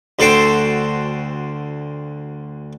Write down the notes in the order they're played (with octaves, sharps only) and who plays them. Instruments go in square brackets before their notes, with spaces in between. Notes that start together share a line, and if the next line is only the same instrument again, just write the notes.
[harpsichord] D2 F#4 A4 C5 G5